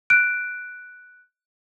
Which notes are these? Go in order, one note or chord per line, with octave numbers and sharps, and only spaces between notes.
F#6 D7